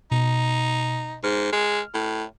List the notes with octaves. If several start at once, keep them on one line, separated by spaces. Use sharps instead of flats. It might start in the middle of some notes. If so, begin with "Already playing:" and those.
B2 D#4
G#2 F6
G#3
A2